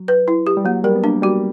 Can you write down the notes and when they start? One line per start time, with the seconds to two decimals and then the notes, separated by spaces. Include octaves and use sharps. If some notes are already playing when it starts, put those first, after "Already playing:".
Already playing: F#3
0.08 B4
0.28 E4
0.47 G4
0.57 G3
0.65 F#3 A#3
0.84 G3 A#4
0.95 B3
1.04 A#3 D4
1.22 G3 F#4